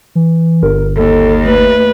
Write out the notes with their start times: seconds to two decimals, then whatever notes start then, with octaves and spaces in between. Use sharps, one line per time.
0.15 E3
0.63 G1 A#4
0.97 D#2 A4
1.45 A3 B4